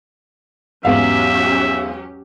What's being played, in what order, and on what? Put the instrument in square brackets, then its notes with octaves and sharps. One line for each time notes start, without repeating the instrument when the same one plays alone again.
[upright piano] E2 G#2 F5 [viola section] F#3 C#4 G4 [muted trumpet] E5